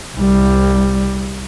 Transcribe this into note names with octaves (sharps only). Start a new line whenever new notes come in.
C2 G3